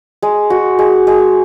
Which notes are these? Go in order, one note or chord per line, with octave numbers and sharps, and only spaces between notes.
G#3
F#4
G#3
G#3